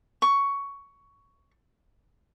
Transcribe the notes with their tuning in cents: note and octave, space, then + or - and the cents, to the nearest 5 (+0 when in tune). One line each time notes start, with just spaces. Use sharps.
C#6 +10